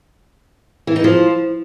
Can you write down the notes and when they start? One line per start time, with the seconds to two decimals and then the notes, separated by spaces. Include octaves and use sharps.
0.87 E3
0.96 D#4
1.04 F3